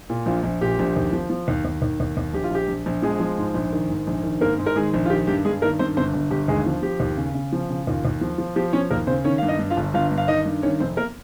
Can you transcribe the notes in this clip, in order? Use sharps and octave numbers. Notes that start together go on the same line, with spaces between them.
A#2
A#1 F4
A#1
A#2 G4
A#1
D#2
F3
F3
D#2
D#2
D#2
D#2
D#2
A#1 G4
F4
A#1 G4
A#1
A#1
F3 G#3 G#4
F3
G#2
A#1
D#3
G#2
A#1
D#3
G#2 A#3 A#4
G#2
A#4
D#3 G#3 G#4
A#1
F4
D#3 G4
G2 G4
G2 G#3 G#4
D#3 A#3 A#4
G2 C4 C5
G1 C4 C5
G1
G1 G4
D#2 G#3 G#4
F3
F3 G4
D#2
C#3
C#3
F3
C#3
D#2 F4
D#2
F3
F3
F3 G4
F3 C#4 C#5
D#2 A#3 A#4
C#3 C4 C5
D#3 C#4 C#5
G2 F5
D#4 D#5
G2
F4 F5
G1
G1 F4 F5
G2
F5
D#3 D#4 D#5
G2
D#3 C#4 C#5
F1 C4 C5
A#3 A#4